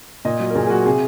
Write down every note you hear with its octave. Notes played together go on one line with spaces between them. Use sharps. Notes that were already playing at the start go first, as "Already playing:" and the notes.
A#2 D#5
F#3
A#4
A#2 G#4
G#4
F#3 F#4
C3 G#4